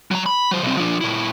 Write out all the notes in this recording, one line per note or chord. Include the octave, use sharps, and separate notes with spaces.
F#3 A#5
B5
F#3 C5
B1 C4
F3 D4
A#2 E4